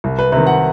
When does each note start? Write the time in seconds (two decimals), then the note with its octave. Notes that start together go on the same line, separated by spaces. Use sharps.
0.04 C2
0.19 B4
0.32 C3 D#3 B4
0.47 F#5